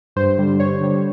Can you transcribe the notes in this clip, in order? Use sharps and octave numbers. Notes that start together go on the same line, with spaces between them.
G2 C5
D3 G3
G2 C#5
D3 G3